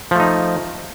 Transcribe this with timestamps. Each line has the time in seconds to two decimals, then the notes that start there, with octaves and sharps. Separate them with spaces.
0.11 F3
0.15 A3
0.20 D#4